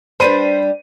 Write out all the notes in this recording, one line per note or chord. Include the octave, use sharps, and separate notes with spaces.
G3 D4 B4 C5 B5 D#7